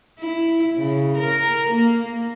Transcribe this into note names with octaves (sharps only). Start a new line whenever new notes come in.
E4
C#3
A#4
A#3